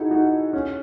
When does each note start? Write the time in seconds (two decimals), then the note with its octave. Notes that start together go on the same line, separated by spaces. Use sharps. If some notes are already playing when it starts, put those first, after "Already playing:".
Already playing: D#4 E4 F#4 G#4 A4
0.11 D#4 F#4
0.53 C#4